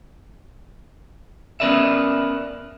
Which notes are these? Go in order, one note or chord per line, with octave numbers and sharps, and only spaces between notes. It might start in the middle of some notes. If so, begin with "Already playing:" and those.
B3 C#4 A#4 B4 D5 E5